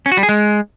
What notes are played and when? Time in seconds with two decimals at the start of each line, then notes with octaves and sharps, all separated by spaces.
0.06 C#4
0.12 F#4
0.17 G3
0.23 G#4
0.29 G#3